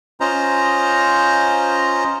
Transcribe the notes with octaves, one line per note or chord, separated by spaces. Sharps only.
C#4 F4 C5 D#5 A#5